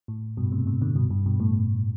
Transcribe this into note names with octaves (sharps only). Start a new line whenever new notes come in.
A2
G2 B2
A2 C3
A2 C3
B2 D3
G2 B2
G2
G2 B2
A2